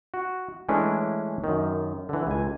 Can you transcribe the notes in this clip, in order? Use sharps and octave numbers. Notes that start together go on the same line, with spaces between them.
F#4
E3 G#3 A3 C#4 D4 E4
F#2 D#3
D3 E3
C#2 G#5